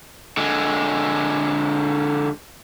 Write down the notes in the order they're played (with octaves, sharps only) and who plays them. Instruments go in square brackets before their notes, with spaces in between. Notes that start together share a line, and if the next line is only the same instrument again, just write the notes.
[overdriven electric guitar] D3 G#3